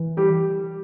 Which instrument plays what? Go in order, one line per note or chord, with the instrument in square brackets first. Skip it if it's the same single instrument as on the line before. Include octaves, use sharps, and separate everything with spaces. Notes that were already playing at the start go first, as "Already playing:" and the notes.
Already playing: [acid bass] E3
[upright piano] G3 G4